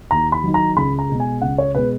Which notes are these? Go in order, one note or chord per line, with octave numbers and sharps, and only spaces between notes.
D#2 A#5
B5
D#3 F#3
A#5
C#2 B5
A#5
B2 G#3
G#5
C#2 F#5
C#5
B2 G#3 B4